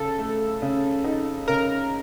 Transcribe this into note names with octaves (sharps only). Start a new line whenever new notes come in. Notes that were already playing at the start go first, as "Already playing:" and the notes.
Already playing: C#3 A4
A3
C#3
D#4
C#3 A#4